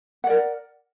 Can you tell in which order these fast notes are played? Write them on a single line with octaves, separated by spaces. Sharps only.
F#5 D5 A#4